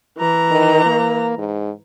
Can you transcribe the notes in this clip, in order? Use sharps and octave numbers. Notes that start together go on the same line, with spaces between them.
E3 A#5
D#3
A#3
G#2